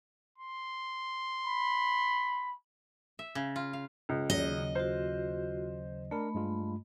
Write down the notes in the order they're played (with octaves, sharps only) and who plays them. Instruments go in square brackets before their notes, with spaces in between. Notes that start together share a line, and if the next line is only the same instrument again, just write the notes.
[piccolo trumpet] C6
[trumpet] B5
[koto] E5
C#3
F4
F5
[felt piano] C#2
[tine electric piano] D#2 C#3 F#3 [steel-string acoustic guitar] D#5
[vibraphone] F4 F#4 [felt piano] C5
[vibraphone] A3 B5 [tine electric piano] D4 A#4
[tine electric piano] G2 G#3 F4